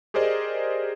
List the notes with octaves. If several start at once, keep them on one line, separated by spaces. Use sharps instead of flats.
G4 G#4 A#4 C5 D5 D#5